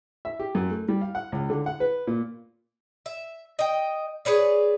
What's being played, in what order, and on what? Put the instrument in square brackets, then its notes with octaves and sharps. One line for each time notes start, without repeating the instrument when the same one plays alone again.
[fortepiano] E5
G4
F#2
A3
G3
F5
F#5
C#2
D3
F#5
B4
A#2
[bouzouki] E5
D#5 G5
G#4 B4 C#5 D5